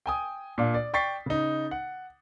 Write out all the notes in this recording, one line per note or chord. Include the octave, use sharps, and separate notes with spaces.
G5 G#5 D#6
A#2 D4 F5
D5
D5 G5 C#6 A6 B6 C7
C#3 D#4
F#5